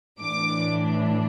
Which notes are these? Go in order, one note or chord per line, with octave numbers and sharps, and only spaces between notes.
A2 E3 D4 D6